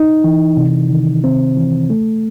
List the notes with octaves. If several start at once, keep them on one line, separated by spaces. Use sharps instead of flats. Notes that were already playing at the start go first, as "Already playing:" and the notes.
Already playing: D#4
E3
C3
D#3
C4
E3
A3